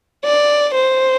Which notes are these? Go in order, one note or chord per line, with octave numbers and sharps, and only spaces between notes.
D5
C5